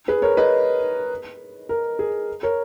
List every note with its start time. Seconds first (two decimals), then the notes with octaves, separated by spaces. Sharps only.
0.08 G#4 B4
0.22 A#4 C#5
0.37 B4 D#5
1.69 A#4
1.99 G#4
2.43 A#4 C#5